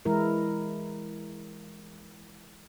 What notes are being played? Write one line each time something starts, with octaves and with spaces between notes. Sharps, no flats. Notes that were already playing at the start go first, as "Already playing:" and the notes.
E3 G#3 E4 A#4